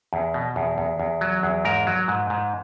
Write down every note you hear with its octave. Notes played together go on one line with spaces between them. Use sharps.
E2
B2
E2
E2
E2
F#3
E2
G#2 A#4
F#3
G#2
G#2